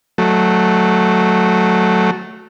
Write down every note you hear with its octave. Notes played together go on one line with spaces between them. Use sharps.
F#3 A3